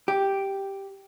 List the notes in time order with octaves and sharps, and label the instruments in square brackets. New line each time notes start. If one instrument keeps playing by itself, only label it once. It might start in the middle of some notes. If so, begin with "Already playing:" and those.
[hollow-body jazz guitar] G4